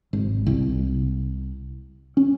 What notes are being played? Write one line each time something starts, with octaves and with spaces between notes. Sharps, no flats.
G#1
C2
C#4